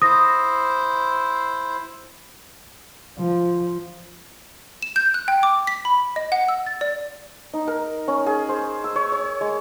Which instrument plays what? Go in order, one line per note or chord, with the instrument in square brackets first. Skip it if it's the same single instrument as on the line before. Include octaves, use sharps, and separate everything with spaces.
[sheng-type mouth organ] E4 C5 [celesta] D#6 A#6
[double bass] F3
[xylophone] E7
G6
F#6
G5
D6
B6
B5
D#5
F#5
E6
A6
D5
[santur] D#4
A#4
C#4
G#4
C5
E6
C#5
C#5
G#3